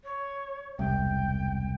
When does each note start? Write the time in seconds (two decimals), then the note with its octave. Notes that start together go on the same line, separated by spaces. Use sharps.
0.04 C#5
0.79 E1 C2 G5